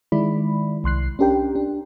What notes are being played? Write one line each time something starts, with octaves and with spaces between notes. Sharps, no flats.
D#3 G#3 E4 D5 B5
C2 C6 F#6 C7
C#4 D4 G4 A#4 G5
D4